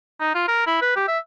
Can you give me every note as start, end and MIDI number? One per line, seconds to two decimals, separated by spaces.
0.20 0.30 63
0.35 0.44 65
0.48 0.66 70
0.67 0.77 64
0.82 0.95 71
0.96 1.05 67
1.08 1.18 76